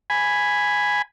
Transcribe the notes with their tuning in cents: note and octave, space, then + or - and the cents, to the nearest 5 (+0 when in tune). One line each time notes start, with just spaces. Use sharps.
G#5 +0 B5 +0